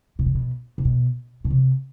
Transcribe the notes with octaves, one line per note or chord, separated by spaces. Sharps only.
B2
C3
B2
C3
B2
B2
C3